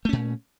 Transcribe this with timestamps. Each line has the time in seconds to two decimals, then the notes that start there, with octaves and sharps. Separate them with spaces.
0.05 A3
0.09 C#4
0.13 A#2